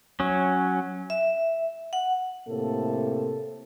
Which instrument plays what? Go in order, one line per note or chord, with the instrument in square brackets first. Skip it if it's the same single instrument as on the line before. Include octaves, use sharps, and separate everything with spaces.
[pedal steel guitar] F#3 C#4
[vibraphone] E5
F#5
[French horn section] A2 C3 A#3 A4